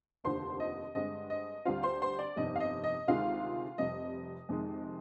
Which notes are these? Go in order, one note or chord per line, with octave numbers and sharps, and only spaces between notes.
F1 D#2 D3 F3 C4 C5 C6
D#5
G2 D3 G#3 C4 D#5
D#5
D2 D3 G3 C4 F4 F5
C5 C6
C5 C6
D5
G1 F2 C3 D#3 D#5
F5
D#5
D#5
D2 C3 D#3 G#3 F4 F5
F1 F2 C3 G3 D#5
F2 C3 D#3 G#3